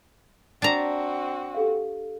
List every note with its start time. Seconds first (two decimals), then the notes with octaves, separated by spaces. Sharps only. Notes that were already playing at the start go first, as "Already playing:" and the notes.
0.62 C4 D4 F#4 A5 A#5
1.54 G4 A4 F5